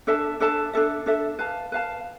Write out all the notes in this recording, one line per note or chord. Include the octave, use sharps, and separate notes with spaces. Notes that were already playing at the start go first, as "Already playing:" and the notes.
D4 A4 E5 A5
D4 A4 E5 A5
D4 A4 E5
D4 A4 E5
B4 F5 A5
B4 F5 A5